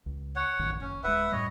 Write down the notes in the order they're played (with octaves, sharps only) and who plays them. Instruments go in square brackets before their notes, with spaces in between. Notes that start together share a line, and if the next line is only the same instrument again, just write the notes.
[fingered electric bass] C#2
[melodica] C#5 F#5
[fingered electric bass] A1 F#2 D#3
[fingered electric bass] F#1 [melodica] C#4
[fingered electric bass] D1 G#3 [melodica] B4 E5 F#5
[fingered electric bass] F#2 A2 G3 [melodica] C#5 D#5